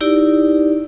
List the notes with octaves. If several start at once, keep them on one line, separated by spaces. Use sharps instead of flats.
D#4 E4 G4 D5